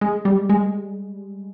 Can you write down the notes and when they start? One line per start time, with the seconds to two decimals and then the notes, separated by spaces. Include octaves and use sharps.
0.01 G#3
0.25 G3
0.49 G#3